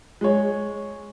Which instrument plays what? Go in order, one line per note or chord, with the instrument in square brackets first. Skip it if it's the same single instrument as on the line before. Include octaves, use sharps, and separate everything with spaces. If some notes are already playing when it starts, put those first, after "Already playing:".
[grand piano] G#3 C#5